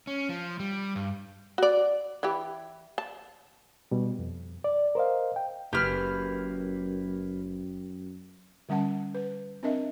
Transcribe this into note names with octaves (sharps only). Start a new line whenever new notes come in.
C#4
F3
G3
G2
F#4 D5
E3 E4 G4
A5
B2 G3
F2
D5
A#4 C5 D#5 F5
G5
F#1 F#2 A#3 E4 G4 B4 F6
D3 G3 C#4 F#5 A5
B4
C4 D4 A#4 D#5 E5